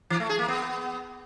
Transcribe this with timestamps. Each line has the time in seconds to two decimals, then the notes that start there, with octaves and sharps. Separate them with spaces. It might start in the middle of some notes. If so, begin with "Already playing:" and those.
0.10 E3
0.20 A3
0.29 G#4
0.39 A#3
0.48 B3